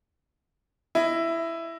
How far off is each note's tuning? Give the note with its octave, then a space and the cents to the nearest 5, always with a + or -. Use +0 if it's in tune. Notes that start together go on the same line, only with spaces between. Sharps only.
E4 +10 D#5 +0